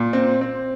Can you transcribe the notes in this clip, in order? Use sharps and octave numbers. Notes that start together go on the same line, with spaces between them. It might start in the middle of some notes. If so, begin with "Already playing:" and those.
Already playing: A#2
C4
C4